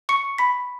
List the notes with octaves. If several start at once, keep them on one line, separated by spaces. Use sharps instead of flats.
C#6 C#7
B5 B6